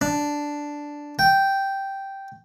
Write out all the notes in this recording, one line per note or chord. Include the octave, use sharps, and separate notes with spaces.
D4
G5